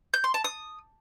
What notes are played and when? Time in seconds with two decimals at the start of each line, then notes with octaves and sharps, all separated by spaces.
0.14 G6
0.24 C6
0.34 A5
0.44 D#6